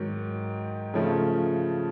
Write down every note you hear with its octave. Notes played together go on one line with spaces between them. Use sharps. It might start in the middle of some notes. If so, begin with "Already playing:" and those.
Already playing: G#2 D#3 F#3
C#3 F3 A3